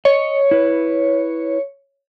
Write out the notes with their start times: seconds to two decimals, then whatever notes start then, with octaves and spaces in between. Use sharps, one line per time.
0.05 C#5 D#5
0.51 E4 B4